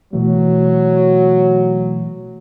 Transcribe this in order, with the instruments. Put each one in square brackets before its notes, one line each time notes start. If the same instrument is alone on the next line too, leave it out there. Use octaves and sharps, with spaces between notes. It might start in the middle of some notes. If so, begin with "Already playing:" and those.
[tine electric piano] B2 E3 A3 [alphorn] F#3